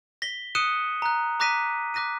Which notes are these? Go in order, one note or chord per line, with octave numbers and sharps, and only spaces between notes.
A#6 B6 G7
D#6 F#6 C#7 D#7 E7 G7
A#5 F#6
A#5 D6 F#6 A#6 B6 D#7
D6 F#6 A#6 B6 D#7